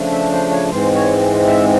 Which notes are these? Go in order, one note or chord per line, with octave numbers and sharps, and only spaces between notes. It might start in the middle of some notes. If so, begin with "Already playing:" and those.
Already playing: C#3 F3 A3 D4
E5
C5
C#5
G#2 E3 G#3 C4 C5
C#5
E5